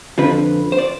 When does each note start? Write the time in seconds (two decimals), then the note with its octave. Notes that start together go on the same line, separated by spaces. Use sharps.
0.18 F2 D3 F3 B4
0.72 C5
0.78 D5